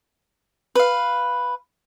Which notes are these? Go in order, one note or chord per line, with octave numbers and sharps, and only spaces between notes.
B4 F5